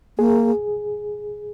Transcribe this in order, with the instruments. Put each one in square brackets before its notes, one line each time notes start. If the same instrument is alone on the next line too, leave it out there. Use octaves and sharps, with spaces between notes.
[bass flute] A#3 [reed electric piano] G#4